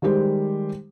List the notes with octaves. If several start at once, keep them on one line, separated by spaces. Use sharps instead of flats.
D#3 G3 G#3 G4 C5